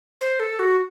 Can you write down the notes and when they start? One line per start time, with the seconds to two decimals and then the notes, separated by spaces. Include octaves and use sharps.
0.21 C5
0.40 A4
0.59 F#4